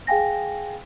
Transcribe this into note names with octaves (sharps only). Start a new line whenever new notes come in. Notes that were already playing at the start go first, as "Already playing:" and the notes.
G#4 F5 G5 G#5 A#6